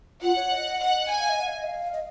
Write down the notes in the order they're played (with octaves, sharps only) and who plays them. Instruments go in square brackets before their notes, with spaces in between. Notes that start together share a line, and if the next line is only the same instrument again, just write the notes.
[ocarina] F4 [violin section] F#5
[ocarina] C#5
D#5
[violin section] F#5
G#5
[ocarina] F5
D#5
F#5
F5
D#5
F5
D#5